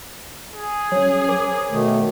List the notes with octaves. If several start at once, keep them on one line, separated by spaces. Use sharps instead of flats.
G#4
F#3 C#4 C#5
A#4 C5 D6
B2 D#3 A3